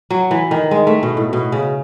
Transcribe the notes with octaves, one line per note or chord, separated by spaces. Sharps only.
F#3
E3
D#3
G#3
A3
B2
A2
B2
C#3